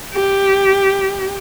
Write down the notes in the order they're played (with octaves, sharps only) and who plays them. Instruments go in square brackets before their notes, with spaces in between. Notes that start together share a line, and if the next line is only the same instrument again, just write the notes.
[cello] G4